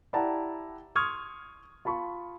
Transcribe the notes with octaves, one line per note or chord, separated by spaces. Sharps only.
E4 G4 D5 F#5 A5 A#5
C6 C#6 D#6 F6 G#6
F4 A5 B5 C#6